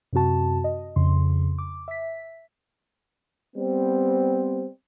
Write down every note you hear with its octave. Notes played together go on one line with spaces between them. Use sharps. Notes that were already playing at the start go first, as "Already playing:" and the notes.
F#2 C3 C4 F#4 A5
D#5
F2 C#3 C6
D6
E5 B6
G3 B3 C4